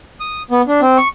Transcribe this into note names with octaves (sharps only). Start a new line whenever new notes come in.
D#6
B3
D4
C4
C#6